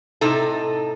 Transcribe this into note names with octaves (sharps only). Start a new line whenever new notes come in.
A2 C3 D#4 A4